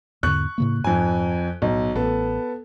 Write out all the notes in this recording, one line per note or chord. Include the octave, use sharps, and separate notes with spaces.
E2 G#2 D3 C#6 F#6
A2 C#3 A#3
F2 G#2 G#5
B1 A2
A1 B3 A4